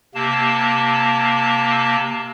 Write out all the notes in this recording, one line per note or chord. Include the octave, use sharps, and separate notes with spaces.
C3 A#3 A5